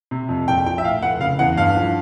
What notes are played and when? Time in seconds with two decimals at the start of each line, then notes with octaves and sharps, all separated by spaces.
0.11 C3
0.29 F2
0.47 A#1 G5
0.66 F3 G5
0.78 E5
0.84 A2 F5
1.02 F1 F#5
1.20 C#3 F5
1.39 E2 F#5
1.57 G2 F5
1.76 F3